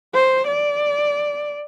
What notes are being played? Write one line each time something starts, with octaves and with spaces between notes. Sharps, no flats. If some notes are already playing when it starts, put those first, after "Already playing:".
C5
D5